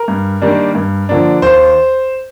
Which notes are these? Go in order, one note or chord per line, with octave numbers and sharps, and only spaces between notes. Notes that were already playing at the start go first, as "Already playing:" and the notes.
Already playing: A#4
G2
D#3 G3 A#3 D4
G2
D3 F3 A#3 D4
D#2 C5